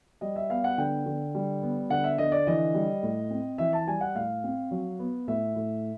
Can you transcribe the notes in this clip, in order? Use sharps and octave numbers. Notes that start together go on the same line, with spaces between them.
G3 D#5
E5
B3 F5
F#5
D3 G5
D3
G3
B3
D3 F#5
E5
D3 D#5
D5
E3 D#5
G3
A2
C4
E3 E5
A5
G3 G#5
F#5
A2 F5
C4
F#3
B3
A2 E5
A2